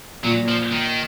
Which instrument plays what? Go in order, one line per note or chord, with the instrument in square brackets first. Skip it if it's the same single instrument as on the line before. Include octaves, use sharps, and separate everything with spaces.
[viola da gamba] A#2 [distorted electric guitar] F#3
[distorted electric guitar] F3
D#3